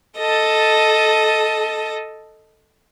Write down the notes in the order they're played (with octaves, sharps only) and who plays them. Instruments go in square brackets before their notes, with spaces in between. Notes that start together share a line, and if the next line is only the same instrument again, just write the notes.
[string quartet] A4 D#5 A5